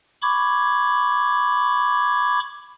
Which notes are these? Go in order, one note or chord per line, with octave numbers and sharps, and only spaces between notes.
B5 C#6 D6 G#6